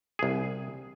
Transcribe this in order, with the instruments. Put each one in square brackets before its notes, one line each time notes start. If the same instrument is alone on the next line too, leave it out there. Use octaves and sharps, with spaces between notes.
[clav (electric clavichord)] C2 G#4